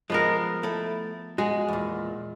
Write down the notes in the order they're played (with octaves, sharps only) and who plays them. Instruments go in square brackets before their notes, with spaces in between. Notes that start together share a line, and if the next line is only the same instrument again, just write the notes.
[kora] F3 B3 A#4 [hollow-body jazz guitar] G#3
[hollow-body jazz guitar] A3 E4 A4
[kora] G#3 [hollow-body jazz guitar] F#4 G#4
[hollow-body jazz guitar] E2 A#2